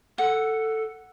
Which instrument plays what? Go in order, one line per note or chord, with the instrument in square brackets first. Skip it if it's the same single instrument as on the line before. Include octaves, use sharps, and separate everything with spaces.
[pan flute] A4 [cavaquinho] F#5